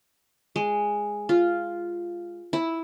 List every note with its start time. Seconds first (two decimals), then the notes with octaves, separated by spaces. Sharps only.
0.56 G#3
1.29 F4
2.53 E4